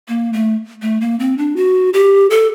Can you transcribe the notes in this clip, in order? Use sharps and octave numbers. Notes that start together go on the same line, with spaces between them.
A#3
A3
A3
A#3
C4
D4
F#4
G4
A4